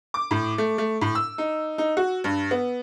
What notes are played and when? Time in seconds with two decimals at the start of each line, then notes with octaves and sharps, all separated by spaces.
0.14 D6
0.31 A2
0.58 A3
0.78 A3
1.01 A2
1.15 E6
1.38 D#4
1.78 D#4
1.97 F#4
2.24 G2
2.51 B3